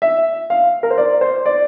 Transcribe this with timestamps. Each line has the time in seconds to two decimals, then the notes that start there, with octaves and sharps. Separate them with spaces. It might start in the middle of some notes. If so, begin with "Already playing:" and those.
0.02 E5
0.50 F5
0.83 A#4
0.91 C5
0.98 D5
1.21 C5
1.46 D5